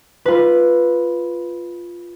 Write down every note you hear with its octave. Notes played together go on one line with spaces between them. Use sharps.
F4 B4